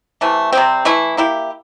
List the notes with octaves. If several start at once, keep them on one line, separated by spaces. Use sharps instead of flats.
C3 E3 A3
C3 G3 C4
E3 A3 E4
A#3 E4 G4